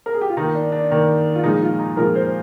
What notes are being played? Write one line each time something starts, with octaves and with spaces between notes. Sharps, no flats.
A#4
G#4
G4
F4
D#3 A#3 D#4
D4
D4
D#3 A#3
F4
A#2 F3 G#3 D#4
F4
D#4
A#2 F3 G#3 A#4
C5